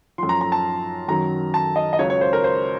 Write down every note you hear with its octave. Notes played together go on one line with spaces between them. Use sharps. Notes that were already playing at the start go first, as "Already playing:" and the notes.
F#2 F3 C6
A#5
A#5
A5
F#2 D#3 F#3 A#5
A5
D#5
D#5
C#2 C#3 F#3 C#5
C#5
C5
A#4
C5